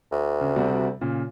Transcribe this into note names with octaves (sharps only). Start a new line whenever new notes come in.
D2
C#3
C3 G3 F#4
A#2 C#3